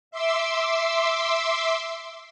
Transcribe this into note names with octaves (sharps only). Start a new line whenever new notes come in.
E5 C6 D6 E6